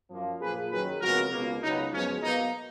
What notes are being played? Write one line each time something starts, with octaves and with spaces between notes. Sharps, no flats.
F#2 F3 A#3
A#2 F3 A#3 G#4 B4
F#2 D#3 F#3 G#4 B4
F2 C#3 G#3 B3 F#4 A#4
C#2 B2 A#3
C#2 C#3 F#3 B3 D#4
F#2 F3 G#3 B3 C#4
B2 A#3 D#4